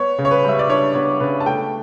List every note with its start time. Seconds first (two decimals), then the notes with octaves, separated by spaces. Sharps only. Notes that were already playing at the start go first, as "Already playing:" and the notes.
Already playing: B3 C#5
0.18 C#3
0.25 C#5
0.31 B4
0.44 G3 E5
0.59 D5
0.69 D4 C#5
0.94 B3 C#5
1.20 C#3 B4
1.40 A5
1.46 A3 G5